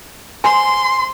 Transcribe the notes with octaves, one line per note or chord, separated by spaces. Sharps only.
C5 G#5 C6